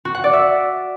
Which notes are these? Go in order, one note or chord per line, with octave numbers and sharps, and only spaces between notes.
F#4
F#5
D5
E5